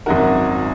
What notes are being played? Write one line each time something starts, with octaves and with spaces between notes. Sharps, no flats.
G#1 F#2 D#3 F#4 A#4